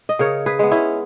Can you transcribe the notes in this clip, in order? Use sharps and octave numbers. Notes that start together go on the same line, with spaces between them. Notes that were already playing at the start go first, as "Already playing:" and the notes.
D#5
C#3 A#4 C#5
G#4 B4
G#3 B3
C#4 E4